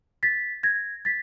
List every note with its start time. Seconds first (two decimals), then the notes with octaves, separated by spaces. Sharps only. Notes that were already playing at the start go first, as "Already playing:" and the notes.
0.23 A6 B6
0.63 G#6 A#6
1.05 A6 B6